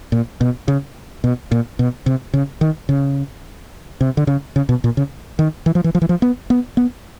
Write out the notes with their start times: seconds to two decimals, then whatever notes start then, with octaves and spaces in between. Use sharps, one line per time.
0.12 A#2
0.41 B2
0.68 C#3
1.24 B2
1.51 A#2
1.79 B2
2.06 C3
2.34 C#3
2.61 D#3
2.89 C#3
4.01 C3
4.17 D3
4.27 C#3
4.56 C#3
4.69 B2
4.84 A#2
4.97 C#3
5.39 D#3
5.66 E3
5.75 F3
5.84 E3
5.95 F3
6.02 E3
6.09 F3
6.22 B3
6.50 B3
6.77 B3